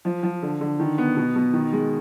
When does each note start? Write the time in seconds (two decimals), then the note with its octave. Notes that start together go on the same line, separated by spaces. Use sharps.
0.05 F3
0.23 F3
0.42 D3
0.61 D3
0.80 D#3
0.98 B3
1.17 B2
1.36 B2
1.53 D#3
1.73 G#3